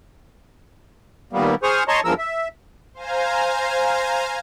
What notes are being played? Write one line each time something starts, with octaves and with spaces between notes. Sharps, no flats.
D#2 A#2 G3 A#3 B3
G#4 C5 C#6 D#6 F6
C#5 D#5 A5 A#5 C6 C#6
E2 G2 F3 G#3 A#4 E6
E5
C5 F5 G#5 A#5